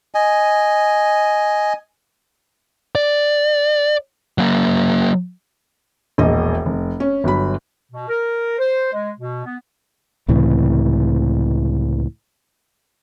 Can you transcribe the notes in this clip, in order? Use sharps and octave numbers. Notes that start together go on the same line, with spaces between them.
D#5 G#5
D5
F#3 A#3
E1 A#1 D#5
F1
C#4
G1 F#3 B5
B2
A#4
C5
G#3
B2
B3
C#2 A2 C3 E3